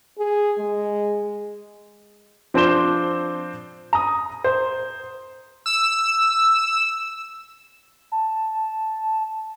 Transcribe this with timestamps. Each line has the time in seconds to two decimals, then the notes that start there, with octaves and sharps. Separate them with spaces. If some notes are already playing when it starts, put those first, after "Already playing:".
0.19 G#4
0.58 G#3
2.54 F3 C4 D4 C5 E7 G7
3.93 A#5 D#6
4.44 C5
5.66 E6
8.12 A5